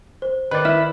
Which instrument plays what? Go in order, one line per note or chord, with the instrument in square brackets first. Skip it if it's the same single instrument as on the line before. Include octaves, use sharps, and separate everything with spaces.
[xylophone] C5
[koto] D#3 [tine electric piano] B4 D5
[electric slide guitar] E4 [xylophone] F6